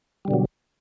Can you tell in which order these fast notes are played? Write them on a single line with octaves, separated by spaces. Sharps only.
G3 D3 B2 F#3